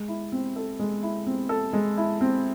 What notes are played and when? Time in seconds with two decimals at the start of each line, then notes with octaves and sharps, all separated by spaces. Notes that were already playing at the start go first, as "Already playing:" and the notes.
Already playing: G#3
0.08 E4
0.32 C4
0.56 A4
0.79 G#3
1.03 E4
1.26 C4
1.49 A4
1.73 G#3
1.97 E4
2.21 C4